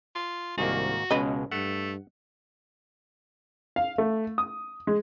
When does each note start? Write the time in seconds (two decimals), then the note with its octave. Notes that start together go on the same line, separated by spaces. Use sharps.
0.15 F4
0.58 C2 G#2 D#3 A#3 F#4
1.11 C#2 B2 G#3 C#4 B4 D#5
1.51 G2 A3 F#5
3.76 F5
3.98 A3
4.38 D#6
4.87 G#3